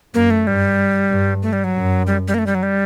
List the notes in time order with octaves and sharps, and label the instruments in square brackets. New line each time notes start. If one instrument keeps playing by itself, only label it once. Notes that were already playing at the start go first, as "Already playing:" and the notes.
[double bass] F#2 [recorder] A#3
[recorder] A3
[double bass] G2 [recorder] G3
[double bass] G2
[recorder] A3
G3
F#3
[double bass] F#2
[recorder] G3
G3
A#3
A3
G3
F#3
G3